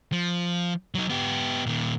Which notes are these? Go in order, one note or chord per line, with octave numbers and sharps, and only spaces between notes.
F3
F#3 D#4
B3 G4
A#2 D#3